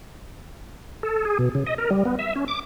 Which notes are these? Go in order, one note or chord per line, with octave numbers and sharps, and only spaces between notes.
A4
G#4
B2
C#3
D#5
A#4
G3
B3
E5
C#4
D6